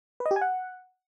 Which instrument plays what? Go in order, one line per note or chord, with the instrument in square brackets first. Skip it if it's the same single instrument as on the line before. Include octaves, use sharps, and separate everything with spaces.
[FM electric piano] B4
D#5
G4
G#5
F#5